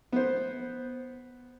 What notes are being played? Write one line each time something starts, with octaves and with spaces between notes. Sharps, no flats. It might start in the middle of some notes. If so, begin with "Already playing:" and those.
B3 C5